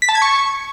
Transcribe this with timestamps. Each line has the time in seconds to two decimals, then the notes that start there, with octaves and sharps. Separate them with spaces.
0.02 B6
0.09 A5
0.15 G#6
0.22 C#6